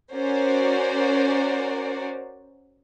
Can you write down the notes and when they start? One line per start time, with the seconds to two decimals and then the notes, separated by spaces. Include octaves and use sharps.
0.14 C#4 F#4 A#4 C5 D5